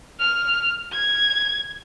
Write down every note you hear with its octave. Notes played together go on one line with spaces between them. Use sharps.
F6
G#6